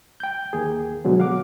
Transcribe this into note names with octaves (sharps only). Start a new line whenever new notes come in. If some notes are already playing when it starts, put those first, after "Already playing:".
G5 G6
D#2 A#3 G#4
B2 D3 F#3 G#3
F5 F#5 D6